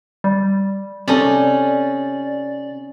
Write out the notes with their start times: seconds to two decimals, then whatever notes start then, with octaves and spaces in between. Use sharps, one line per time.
0.24 G3
1.08 C3 C#4 D#4 A4 D5 D#5